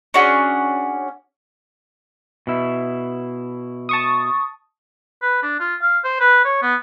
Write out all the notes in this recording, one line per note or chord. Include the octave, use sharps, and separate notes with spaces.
C#4 D4 F#4 G#4
B2 E4
A5 C#6 D#6
B4
D4
F4
F5
C5
B4
C#5
B3